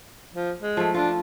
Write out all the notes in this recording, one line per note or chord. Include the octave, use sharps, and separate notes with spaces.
F3
G#3
F3 A3
D4 F4 A4